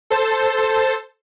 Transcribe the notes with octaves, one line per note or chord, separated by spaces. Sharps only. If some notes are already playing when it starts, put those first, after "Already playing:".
A4 C5 A5